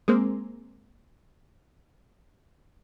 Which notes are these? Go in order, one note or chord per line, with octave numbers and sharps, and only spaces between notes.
G#3 A#3 C4